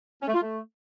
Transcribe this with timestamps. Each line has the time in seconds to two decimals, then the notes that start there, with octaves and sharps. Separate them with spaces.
0.21 C#4
0.28 A3
0.34 F4
0.41 A3